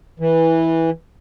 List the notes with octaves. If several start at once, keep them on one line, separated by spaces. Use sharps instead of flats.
E3